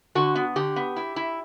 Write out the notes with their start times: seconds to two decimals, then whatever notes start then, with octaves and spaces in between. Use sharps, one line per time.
0.15 D3 F#4
0.35 B3
0.56 D3 G4
0.76 B3
0.96 E4
1.16 E4